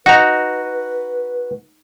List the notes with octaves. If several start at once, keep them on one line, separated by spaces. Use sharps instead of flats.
D#4 F#4 B4 F#5 A#5